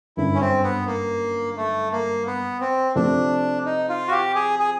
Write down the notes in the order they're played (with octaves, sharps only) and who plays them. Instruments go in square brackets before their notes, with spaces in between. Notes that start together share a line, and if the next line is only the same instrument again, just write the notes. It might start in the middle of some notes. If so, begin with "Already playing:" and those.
[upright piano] G1 F#2 D3 [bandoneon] E4
[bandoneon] C#4
C4
B3
A#3
A3
A#3
B3
C4
[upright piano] C3 F3 A3 C4 [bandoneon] D4
[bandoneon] D#4
F4
F#4
G4
G#4
G#4